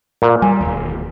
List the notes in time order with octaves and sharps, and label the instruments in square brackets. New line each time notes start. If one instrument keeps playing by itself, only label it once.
[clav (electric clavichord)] A#2
[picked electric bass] G3 [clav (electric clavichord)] G#5
[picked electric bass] E1 D#2